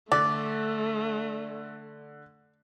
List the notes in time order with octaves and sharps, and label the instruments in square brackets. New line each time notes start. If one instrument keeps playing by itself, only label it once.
[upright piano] D3 [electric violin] A3 [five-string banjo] D5